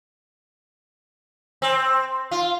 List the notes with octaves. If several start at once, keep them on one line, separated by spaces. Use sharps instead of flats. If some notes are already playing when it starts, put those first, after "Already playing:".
C4
F4